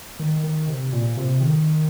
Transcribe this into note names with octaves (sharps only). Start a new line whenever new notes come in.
D#3
D#3
C3
A#2
C3
D#3